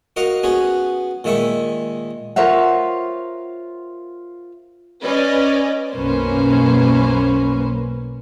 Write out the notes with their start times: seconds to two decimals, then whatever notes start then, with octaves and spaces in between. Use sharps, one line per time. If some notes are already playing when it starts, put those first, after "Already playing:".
0.16 F#4 A#4 D#5 F5 F#5
0.44 B3 C#4 F#4 G#4 B4
1.24 A#2 D#3 G#3 E5 B5 C#6
2.36 F4 A#4 C5 C#5 E5 F#5
5.03 C#4 B4 D5 D#5
5.93 B1 F#2 A#3 C#4 B4 C5